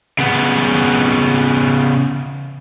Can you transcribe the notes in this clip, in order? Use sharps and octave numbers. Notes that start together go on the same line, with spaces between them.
C#3 B3